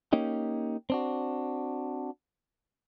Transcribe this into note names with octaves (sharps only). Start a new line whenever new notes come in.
A#3 C#4 D#4 G4
C4 D4 F#4